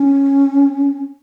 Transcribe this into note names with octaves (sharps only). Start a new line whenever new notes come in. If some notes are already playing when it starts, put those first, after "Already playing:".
Already playing: C#4